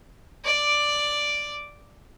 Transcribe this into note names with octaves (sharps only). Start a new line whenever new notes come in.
D5 D6